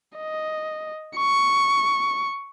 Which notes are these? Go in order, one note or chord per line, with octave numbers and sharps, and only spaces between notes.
D#5
C#6